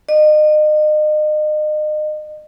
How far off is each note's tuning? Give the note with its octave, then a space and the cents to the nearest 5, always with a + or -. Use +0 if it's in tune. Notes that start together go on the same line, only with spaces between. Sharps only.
D#5 -35